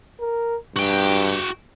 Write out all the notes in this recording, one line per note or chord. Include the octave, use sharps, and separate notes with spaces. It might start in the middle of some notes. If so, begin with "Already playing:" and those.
A#4
G2 F#4 G5